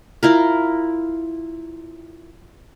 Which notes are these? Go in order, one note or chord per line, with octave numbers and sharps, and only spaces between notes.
E4 F4 A#4